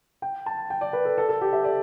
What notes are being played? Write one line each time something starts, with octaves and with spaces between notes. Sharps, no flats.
G5
A5
G5
D5
B4
A4
A4
A4
G4
E5
D5